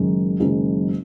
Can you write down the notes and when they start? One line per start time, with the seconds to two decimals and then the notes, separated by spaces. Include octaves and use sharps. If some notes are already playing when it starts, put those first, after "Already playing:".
Already playing: F#1 F#2 D#3 G#3 D#4
0.40 F#1 F#2 D#3 G#3 D#4